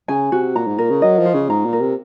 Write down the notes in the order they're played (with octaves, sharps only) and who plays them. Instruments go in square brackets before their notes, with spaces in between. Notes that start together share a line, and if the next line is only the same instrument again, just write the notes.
[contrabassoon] C#3 [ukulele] G#5
[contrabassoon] C3 [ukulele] F#4
[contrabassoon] A#2 [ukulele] A#5
[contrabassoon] G#2
[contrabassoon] A#2 [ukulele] A#4
[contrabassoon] C#3
[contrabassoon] F#3 [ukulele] D#5
[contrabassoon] F3
[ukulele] F4
[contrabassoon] C#3
[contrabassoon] G#2 [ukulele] A#5
[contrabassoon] A#2
[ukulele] A#4
[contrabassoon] C3